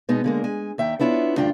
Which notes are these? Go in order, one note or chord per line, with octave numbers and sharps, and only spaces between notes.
B2 G#3 B3 D#4
D3 G#3 A#3
G#3 G#5
D#2 E5 G5 A#5
B3 D4 E4 F4 C#5
D2 G2 D4 F4 G5